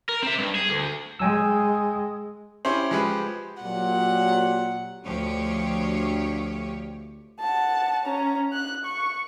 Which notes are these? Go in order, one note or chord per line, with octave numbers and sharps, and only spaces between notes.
A#4
C4 E5
G2
G#4
D2
G#3 G5 G#5 E6
C#4 E4 G4 C5
F3 G#3 G4 B4
A#2 F#3 G4 F#5
D2 D3 F3 G4 C#5
F#5 A5
C#4 A#5
F#6
C#6